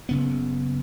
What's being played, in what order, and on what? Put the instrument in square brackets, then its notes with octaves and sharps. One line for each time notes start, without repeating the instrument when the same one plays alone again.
[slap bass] F#1 C#3 B3